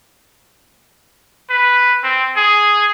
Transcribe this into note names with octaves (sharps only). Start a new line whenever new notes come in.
B4
C4
G#4